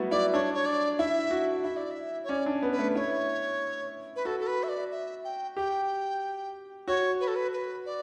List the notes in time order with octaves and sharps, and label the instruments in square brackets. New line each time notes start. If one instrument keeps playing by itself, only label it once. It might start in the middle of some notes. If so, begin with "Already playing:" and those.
Already playing: [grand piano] F#3 G3 A3 B3 E4 F#4
[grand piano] E4 [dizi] D5
[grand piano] D4 [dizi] C#5
[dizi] C#5
D5
[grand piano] E4 [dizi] E5
[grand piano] F#4
[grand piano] E4 [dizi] E5
[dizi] D5
E5
C#5
[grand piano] C#4 [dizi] D5
[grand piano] D4
B3
[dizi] B4
[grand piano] A3
[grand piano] E4 [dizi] C#5
[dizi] B4
[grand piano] F#4 [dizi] A4
[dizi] A4
B4
E5
D5
E5
G5
[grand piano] G4 [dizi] G5
[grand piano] F#4 [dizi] C#5
[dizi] B4
A4
B4
B4
D5